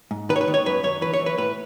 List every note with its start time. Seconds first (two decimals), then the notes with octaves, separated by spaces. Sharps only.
0.11 G#2
0.29 D#3 B4
0.36 C#5
0.41 B4
0.48 D#3
0.54 C#5
0.66 F#2 B4
0.84 F#2 C#5
1.01 E3 B4
1.14 C#5
1.20 E3
1.26 B4
1.38 A2 B4